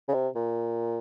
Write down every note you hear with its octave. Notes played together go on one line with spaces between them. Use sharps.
C#3
C3
A#2